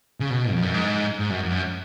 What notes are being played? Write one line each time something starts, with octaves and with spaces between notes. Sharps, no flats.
C#3
B2
F2
F#2
G#2
G#2
F#2
F2
F#2